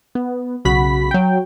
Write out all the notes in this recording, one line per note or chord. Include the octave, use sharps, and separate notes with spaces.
B3
B1 C#3 F#4 B5 B6
F#3 G5